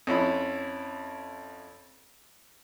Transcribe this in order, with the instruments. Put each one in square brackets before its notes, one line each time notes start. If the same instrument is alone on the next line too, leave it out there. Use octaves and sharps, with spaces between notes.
[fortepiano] F2 C#4 E4 B5